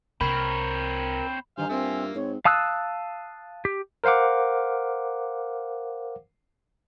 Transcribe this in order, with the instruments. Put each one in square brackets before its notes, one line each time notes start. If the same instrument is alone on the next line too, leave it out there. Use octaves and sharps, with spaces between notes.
[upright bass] C2 [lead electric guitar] C4 C#5 [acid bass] A#4 [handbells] B5
[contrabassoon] G2 [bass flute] D#3 [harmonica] C5 F5 [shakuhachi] G#5
[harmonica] A#3 F4 E5 [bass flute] C4
[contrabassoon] G#2 [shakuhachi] C4 [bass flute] C#5
[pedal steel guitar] F5 A5 D#6 E6 F#6
G4
[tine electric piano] A#4 C5 F5 F#5 D6